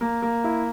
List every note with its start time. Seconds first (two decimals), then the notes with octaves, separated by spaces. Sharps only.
0.01 A#3
0.22 A#3
0.44 E4